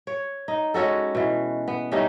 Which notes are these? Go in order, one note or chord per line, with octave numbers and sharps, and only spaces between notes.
C#5
D#4
G#3 C#4 F#4 A4
B2 E3
B3
G3 A3 C#4 D#4